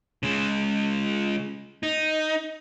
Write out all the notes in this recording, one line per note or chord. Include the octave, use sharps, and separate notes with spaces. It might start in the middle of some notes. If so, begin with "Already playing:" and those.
C#3 G#3
D#4